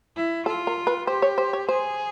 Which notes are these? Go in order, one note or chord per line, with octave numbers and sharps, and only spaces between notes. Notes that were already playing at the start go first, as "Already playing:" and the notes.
E4
F4 A4
A#4
B4
G4 C5
C#5
C5
C#5
G#4 C5